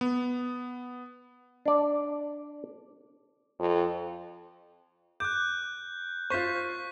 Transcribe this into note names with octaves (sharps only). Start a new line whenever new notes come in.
B3
D4 D5
F2
D6 F#6 G6
F4 C5 C#6 B6